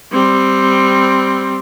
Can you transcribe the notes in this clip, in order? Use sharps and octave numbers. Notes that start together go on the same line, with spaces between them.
G3 C4